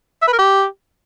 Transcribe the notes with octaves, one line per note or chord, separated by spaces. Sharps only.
E5
B4
A#4
G4